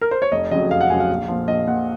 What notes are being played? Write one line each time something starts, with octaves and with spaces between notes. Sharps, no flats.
A#4
C5
C#5
F1 D#5
F2 C#3 F#3 D#5
F1 F5
F#5
F2 C#3 F#3 G#5
F5
A#1
A#2 F3
A#1 D#5
A#2 F3 F#5